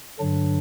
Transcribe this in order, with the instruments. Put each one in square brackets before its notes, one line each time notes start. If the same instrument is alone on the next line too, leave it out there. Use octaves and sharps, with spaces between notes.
[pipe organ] G2 D3 F#3 D4